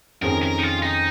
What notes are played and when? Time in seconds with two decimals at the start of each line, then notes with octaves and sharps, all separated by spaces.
0.22 F2 D#3 C#4 G#4 A#4
0.43 A#4
0.58 D#4
0.63 F4
0.82 D#4